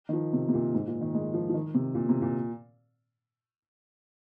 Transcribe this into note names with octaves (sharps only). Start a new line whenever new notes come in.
D#3
F3
C3
C3
A#2
G#2
A#2
D#3
G#3
F3
F3
D#3
C3
A#2
C3
A#2